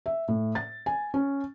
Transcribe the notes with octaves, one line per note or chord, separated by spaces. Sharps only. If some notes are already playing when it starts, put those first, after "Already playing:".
E5
A2
A6
G#5
C#4